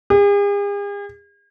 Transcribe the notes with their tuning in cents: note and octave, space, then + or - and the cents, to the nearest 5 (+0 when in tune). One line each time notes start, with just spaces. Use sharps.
G#4 -45